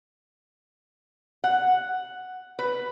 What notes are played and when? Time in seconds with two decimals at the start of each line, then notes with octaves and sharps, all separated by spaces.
1.44 F#5
2.59 B4